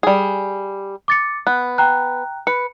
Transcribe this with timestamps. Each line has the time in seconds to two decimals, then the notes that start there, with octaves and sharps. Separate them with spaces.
0.03 G3 G#4
1.08 D6 A6 C#7
1.47 B3 F#6
1.78 G5 A#5 F#6
2.47 B4 C#7